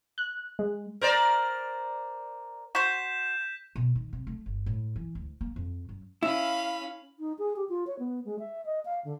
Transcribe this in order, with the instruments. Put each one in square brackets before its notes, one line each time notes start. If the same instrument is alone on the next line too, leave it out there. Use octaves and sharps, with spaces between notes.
[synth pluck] F#6
G#3
[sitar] A#4 C5 D5
[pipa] F#4 C5 [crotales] G6 B6 E7
[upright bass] B2
D#3
C3
A3
G1
A2
E3
D2
A#3
F2
F#2
[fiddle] C#4 B5 [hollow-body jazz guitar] E4 [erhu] F5
[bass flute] D#4
G#4
G4
F4
C#5
B3
G#3
E5
D#5
F5
D3